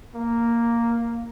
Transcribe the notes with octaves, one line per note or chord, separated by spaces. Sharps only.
A#3